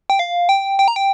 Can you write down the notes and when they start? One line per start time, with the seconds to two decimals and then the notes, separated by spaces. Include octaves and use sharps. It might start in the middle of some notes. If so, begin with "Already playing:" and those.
0.10 G5
0.19 F5
0.49 G5
0.79 G5
0.88 A#5
0.96 G5